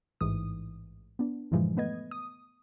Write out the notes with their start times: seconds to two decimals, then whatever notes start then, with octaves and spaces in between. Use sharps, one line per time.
0.21 A1 G#2 E3 D#6
1.19 B3 D4
1.51 G2 A#2 D3 E3 F3 G#3
1.77 A3 B3 B4 D#5 G#6
2.11 D#6